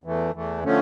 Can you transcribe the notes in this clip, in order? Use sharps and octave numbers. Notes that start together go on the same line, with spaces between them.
E2 E3 A3
E2 E3 A3
D3 F3 A3 C#4